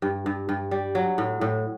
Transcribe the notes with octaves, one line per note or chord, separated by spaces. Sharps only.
G2
G2
G2
G3
F#3
A2
A2